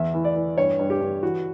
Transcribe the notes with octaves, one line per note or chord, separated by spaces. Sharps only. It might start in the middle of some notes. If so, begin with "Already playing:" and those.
Already playing: E2 E5
E3
D5
E3
G2 C#5
G2
G4
G2
E3 F#4